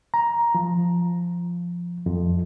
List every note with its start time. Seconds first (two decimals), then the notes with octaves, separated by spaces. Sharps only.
0.14 A#5
0.55 F3
2.06 F2